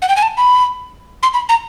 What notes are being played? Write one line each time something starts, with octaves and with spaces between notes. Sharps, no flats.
F#5
G5
G#5
A5
B5
C6
B5
A#5